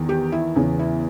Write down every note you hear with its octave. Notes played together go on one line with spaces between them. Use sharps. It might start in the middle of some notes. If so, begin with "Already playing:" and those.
Already playing: E2 D#3
G4
E4
E2 C#3 E3
E4